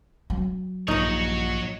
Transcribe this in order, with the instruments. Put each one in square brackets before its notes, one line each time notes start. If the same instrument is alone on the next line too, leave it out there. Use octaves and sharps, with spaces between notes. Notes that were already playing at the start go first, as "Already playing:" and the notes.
[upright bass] F#3
[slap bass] A#1 G2 [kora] D#4 D#5 [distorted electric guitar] F#4 C#5